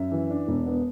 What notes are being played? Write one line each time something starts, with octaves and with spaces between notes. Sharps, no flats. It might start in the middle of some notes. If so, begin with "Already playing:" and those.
Already playing: F#2 E5
E3
D4
E1
B3